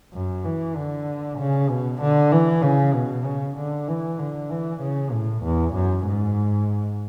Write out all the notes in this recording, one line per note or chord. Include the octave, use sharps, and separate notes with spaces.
F#2
E3
D3
C#3
B2
D3
E3
C#3
B2
C#3
D3
E3
D3
E3
C#3
A2
E2
F#2
G#2